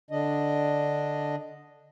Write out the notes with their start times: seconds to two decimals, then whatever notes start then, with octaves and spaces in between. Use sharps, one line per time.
0.11 D3 D4 D#5